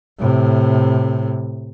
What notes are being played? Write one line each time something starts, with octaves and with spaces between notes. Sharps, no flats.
A2 C3